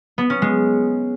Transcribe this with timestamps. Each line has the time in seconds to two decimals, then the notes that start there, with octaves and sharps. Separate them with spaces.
0.18 B3
0.30 C#4
0.42 G#3